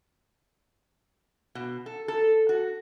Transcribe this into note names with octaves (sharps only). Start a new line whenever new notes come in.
B2
A4
A4
F#4